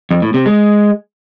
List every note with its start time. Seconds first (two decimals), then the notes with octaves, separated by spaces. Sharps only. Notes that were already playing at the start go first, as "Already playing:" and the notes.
0.11 F2
0.22 A2
0.34 C3
0.46 G#3